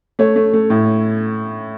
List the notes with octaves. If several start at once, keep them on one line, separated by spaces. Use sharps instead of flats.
A3 C#5
A3
A3
A2